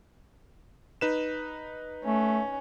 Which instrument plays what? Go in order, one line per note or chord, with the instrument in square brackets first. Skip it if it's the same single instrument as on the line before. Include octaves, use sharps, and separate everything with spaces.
[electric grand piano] D#4 B4 E7
[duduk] A3 [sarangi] C#4